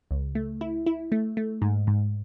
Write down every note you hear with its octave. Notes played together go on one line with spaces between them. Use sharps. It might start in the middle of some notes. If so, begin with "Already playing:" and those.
C#2
A3
E4
E4
A3
A3
G#2
G#2